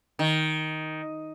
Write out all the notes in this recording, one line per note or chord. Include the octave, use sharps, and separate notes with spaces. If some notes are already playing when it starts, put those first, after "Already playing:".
D#3